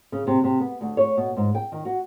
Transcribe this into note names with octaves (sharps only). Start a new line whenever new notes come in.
C#3
C3
C3
B3
D2
C#5
B2
G#2
G5
D#3
F#4